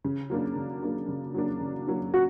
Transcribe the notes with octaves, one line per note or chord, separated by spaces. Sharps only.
C#3
F#3 A#3 D4
C#3
F#3 A#3 D4
C#3
F#3 A#3 D4
C#3
F#3 A#3 D4
F#4